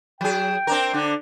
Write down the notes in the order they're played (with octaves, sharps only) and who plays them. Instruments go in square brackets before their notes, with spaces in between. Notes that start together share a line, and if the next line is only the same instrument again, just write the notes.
[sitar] F#3 G#4 [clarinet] G5
[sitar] C4 D4 A#4
D3 D4